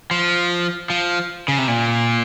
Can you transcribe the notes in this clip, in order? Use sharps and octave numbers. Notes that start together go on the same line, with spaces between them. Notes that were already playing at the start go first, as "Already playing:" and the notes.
F3
F3
C#3
C3
A#2